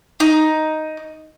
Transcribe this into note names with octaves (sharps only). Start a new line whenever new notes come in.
D#4